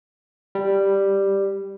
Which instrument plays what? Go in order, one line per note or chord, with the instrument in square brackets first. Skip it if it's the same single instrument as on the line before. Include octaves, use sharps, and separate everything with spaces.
[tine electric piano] G3